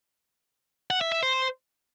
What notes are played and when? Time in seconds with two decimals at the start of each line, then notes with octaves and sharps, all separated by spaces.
0.90 F#5
1.01 E5
1.12 E5
1.23 C5